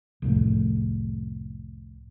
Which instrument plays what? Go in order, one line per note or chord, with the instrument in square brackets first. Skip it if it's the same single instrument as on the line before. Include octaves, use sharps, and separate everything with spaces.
[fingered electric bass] C2 F2 A2